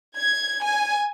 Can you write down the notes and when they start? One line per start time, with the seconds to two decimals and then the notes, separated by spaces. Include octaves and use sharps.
0.17 G#6
0.64 G#5